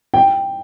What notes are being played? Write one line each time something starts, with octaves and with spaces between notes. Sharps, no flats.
G5